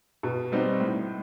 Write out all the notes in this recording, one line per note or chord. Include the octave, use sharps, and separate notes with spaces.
B2
G3 C4 D#4 F#4
A2